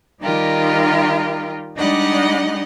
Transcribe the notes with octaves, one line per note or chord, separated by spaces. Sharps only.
D#3 G3 D#4 F4 G4 A#4
G3 G#3 D4 D#4 D#5 F#5